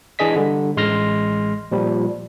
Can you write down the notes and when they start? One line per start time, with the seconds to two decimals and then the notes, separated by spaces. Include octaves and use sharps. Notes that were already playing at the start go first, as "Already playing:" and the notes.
0.19 E3 D4 G#4 D#5 B6
0.36 D3 G3
0.77 A1 G#3 C6 F6 A#6
1.72 A#2 F3 G3